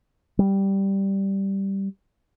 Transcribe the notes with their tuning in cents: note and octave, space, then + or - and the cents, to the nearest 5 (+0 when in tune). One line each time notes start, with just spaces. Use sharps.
G3 -5